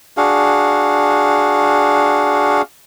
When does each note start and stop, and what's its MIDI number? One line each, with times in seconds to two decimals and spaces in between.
0.17 2.62 62
0.17 2.62 66
0.17 2.62 68
0.17 2.62 77